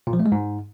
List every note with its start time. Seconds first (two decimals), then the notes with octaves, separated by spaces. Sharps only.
0.07 A#2
0.13 F3
0.19 A3
0.26 G#3
0.32 G#2